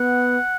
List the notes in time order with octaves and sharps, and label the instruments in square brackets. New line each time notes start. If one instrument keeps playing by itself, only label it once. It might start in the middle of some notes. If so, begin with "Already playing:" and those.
Already playing: [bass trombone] B3 [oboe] F#5